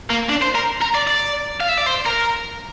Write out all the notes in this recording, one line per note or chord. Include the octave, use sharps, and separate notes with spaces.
A#3
D4
C5
A#4
A#4
D5
D5
F5
E5
D5
C5
A#4